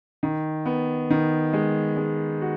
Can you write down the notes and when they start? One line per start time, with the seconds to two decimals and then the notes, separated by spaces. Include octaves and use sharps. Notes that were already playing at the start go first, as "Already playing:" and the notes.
0.23 D#3
0.65 B3
1.10 D#3
1.53 G#3
1.97 G#3
2.41 F#4